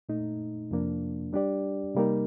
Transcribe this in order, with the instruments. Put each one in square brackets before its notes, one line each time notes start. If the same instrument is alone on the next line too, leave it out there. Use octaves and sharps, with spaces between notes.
[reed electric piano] A#2 A3 D#4
F2 C3 F3 A#3 D4
G3 D4 G4 D5
C3 G3 A#3 D#4 A#4